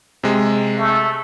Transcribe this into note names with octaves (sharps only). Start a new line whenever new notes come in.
C3 G#3
A3